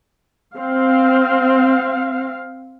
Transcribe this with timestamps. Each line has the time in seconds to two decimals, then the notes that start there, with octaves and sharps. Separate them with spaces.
0.56 C4 F5